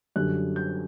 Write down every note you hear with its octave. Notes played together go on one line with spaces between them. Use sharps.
F#2 D3 G3 F#6
G6